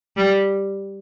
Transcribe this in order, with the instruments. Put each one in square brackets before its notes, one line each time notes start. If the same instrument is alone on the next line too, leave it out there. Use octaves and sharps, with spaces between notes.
[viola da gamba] G3